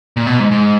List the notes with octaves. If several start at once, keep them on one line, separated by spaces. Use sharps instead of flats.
A#2
B2
G#2
G#2